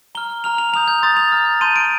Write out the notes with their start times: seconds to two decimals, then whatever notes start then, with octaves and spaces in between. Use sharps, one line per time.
0.15 A#5 F6 G7
0.44 A#5 F6 F7
0.58 F7
0.73 A#5 D#6 G6 F7
0.88 G6
1.02 C6 D#6 G6 A6
1.17 F7
1.32 A#5 F6
1.61 A5 C6 G6 D#7
1.76 D7